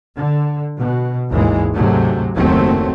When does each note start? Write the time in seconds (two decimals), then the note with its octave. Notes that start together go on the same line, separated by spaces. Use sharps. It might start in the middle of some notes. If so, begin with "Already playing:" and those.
0.16 D3
0.78 B2
1.29 G#1 D#2 E3 G#3
1.74 D2 G#2 C3 F#3 A3
2.35 F#1 D#2 F#3 A3 C4